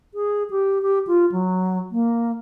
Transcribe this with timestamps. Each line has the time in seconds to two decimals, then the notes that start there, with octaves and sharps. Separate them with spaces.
0.14 G#4
0.50 G4
0.82 G4
1.07 F4
1.32 F#3
1.91 A#3